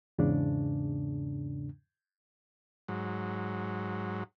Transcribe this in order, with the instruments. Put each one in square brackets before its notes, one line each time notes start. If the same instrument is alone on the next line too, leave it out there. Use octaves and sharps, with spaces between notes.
[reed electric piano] E2 G#2 C#3 D4
[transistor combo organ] G#2 F#3